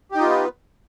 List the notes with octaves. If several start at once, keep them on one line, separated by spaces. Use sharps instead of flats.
B3 D#4 F4 G4 B4